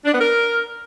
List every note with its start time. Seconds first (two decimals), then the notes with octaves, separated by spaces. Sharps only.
0.05 D4
0.13 B3
0.20 A#4